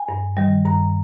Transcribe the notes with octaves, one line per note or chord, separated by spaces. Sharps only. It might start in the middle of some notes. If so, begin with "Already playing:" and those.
Already playing: G#5
G2
D#3 G3
G2 A#5